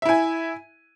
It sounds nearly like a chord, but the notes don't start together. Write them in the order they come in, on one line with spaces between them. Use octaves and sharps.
E5 E4 G#5